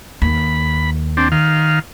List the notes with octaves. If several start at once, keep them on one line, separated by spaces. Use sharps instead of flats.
D#2 B5
C4 D4
D#3 F5